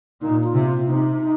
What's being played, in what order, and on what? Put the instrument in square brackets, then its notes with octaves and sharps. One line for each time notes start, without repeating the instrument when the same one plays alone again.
[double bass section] A#2 [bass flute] D#4
[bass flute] F4
[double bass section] C3
[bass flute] F4
[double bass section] C3 [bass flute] D#4
[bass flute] D#4